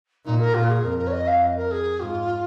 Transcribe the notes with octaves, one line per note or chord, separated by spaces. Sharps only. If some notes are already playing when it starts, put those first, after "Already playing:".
A#2 D#4
A#4
A#2 F4
G#4
F2 A#4
A#4
C#5
D#5
F5
D#5
A#4
G#4
G#2 F4